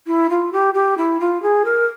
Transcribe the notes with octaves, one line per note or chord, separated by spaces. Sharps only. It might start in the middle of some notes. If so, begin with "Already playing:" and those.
E4
F4
G4
G4
E4
F4
G#4
A#4